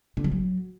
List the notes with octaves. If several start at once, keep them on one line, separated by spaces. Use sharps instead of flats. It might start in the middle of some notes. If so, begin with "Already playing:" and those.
D3
G3
F#3